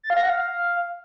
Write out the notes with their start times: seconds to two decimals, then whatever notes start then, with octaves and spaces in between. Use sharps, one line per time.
0.03 A6
0.10 F5
0.17 A#6
0.23 F#5
0.30 F5